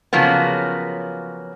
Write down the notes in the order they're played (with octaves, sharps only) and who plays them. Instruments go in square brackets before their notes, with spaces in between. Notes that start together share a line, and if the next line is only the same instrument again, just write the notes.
[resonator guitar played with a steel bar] C#3 F3 F#3 A#3 B3